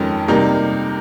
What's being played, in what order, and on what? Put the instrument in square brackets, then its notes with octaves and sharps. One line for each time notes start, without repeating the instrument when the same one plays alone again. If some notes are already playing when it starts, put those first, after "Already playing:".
Already playing: [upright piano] F2 D#3 G#3 C#4 A#4
C3 G3 A#3 D#4 A#4